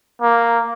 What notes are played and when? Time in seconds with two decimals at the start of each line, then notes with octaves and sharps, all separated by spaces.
0.22 A#3